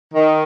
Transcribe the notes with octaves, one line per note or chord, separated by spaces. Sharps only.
D#3